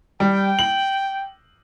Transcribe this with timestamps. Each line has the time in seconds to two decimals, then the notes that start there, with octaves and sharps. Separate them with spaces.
0.20 G3 G5
0.59 F#7